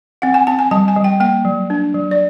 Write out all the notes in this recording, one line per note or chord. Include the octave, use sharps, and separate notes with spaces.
C4 F#5
G#5
C4 A5
G#5
G3 A5
G#5
G3
G5
A#3 G5
F#3
D4
F#3
D5